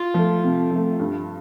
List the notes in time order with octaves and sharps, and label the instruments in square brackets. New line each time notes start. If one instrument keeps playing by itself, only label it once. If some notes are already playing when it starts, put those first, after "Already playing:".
Already playing: [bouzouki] F4
[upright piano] F3 A3
C3
F3 A3
G2